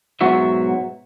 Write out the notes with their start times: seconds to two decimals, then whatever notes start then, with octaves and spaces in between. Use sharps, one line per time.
0.21 G#2 B2 F#3 F#4 E5